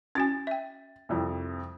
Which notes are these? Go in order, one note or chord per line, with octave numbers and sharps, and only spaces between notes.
C#4 F#4 G#5 A6
E5 G5
C2 F2